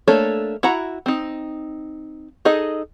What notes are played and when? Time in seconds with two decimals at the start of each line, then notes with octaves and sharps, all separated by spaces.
0.08 A3 A#3 D4 A4 C#5
0.63 E4 F#4 F#5 A#5
1.06 C4 D#4
2.45 D#4 G#4 A4 D#5